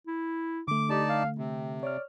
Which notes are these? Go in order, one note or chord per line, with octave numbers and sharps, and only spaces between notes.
E4
D3 A3 D6
D#4 G4 D5 A5
F5
C3 C4
C#5 D5 F6